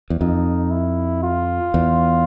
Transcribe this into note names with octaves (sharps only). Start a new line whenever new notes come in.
E2
F2 D#4
E4
F4
E2